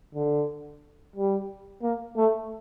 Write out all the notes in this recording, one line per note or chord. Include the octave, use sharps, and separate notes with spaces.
D3
G3
A#3
A3